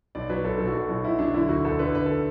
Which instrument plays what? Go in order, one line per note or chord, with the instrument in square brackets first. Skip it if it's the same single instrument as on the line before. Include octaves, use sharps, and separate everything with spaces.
[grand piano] B1 D5
F#3 B4
B1 A4
B1 A4
F#4
B1 A4
B1 F#4
B1 E4
F#3 D4
D3 E4
D2 F#4
D2 A4
D3 B4
D2 B4
A4